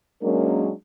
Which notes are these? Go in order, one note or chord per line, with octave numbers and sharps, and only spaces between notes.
F#3 G#3 A#3 C#4 D4 A#4